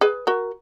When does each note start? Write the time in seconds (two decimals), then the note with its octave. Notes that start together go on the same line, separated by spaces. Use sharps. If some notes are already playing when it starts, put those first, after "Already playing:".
0.01 G#4 B4
0.27 F#4 A#4